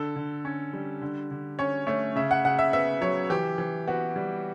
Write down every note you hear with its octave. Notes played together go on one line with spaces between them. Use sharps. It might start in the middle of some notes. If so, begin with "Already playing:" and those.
Already playing: D3 A4
D3
C#4
G3
D3
D3
C#4 C#5
A3 C#5
C#3 E5
F#5
C#3 F#5
E5
B3 E5
F#3 C#5
E3 G4
E3
B3 F#4
G3